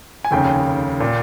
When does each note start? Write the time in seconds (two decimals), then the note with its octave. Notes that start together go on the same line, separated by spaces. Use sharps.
0.25 G#5
0.31 F1 D#2 C#3 G5
1.00 A#2